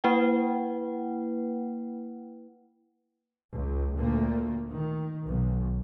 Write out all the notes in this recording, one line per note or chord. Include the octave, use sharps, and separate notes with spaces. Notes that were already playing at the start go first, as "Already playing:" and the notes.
A#3 E4 B4 F#5 G5
C#2
D2 A#2 A3 A#3
D#3
B1